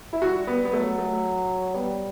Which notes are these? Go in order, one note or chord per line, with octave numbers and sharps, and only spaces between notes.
E4
G3 F#4
B3
B3
F#3 A3
A3
G3 B3